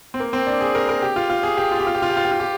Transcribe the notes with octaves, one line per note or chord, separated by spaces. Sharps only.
C4
A#3
C4
D4
G#4
A#4
A#4
G4
F4
F4
G#4
G4
F4
G4
F4
G4
F4
G4
F4
G4
F4
G4